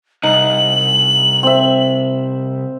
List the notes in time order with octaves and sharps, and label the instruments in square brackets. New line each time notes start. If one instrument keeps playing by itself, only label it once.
[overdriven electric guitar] C2 [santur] D#4 [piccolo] F#7
[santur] C4 E5